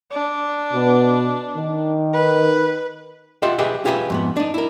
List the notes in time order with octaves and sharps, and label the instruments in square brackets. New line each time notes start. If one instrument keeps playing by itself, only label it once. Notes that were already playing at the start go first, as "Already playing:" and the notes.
[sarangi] D4
[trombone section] B2 B3
D#3
[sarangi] B4
[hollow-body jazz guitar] F4 G4 D#5 E5 F#5
G4 G#4 B4 D#5 E5 F#5
F4 G4 G#4 B4 E5
F2 G#2 B3
D4 D#4
E4 A#4